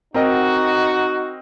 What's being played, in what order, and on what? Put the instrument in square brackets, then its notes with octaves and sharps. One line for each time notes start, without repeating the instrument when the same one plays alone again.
[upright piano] C4 A#4 D#5 [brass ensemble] D#4 F#4